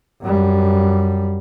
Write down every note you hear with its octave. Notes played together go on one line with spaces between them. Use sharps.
F#2 G3